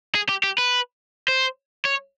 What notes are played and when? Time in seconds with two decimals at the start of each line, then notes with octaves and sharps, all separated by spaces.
0.15 G#4
0.29 G4
0.44 G4
0.58 B4
1.28 C5
1.85 C#5